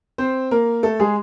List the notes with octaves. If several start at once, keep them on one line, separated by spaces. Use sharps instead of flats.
C4 C5
A#3 A#4
A3 A4
G#3 G#4